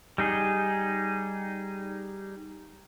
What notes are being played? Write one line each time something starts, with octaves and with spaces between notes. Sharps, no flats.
G3 D#4 G#4